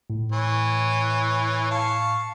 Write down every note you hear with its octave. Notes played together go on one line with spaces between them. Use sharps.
A2
E3 C#5
F5 A5 C#6